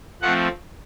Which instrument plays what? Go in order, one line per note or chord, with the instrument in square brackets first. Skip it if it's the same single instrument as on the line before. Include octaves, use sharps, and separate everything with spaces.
[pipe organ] F3 A3 C4 F#5